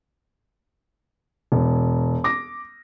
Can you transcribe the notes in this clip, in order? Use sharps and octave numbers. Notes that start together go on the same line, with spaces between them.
E1
D6 A#6